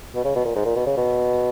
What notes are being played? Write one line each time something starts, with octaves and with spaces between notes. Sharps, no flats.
B2
C#3
B2
A#2
G#2
A#2
B2
C#3
B2